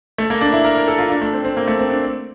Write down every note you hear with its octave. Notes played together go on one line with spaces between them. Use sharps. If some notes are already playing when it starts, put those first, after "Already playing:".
A3
A#3
D4
E4
A#4
A#4
A4
F4
D4
A3
C4
C4
A#3
A3
C4
D4